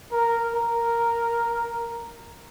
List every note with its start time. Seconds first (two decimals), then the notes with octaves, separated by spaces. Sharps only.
0.12 A#4
0.54 A#4